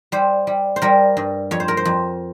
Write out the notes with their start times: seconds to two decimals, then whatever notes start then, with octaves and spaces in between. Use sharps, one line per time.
0.12 G3 C5
0.47 G3
0.76 C5
0.82 G3 A#4
1.17 G2
1.51 F2 C#5
1.60 C5
1.68 A#4
1.77 C5
1.85 F2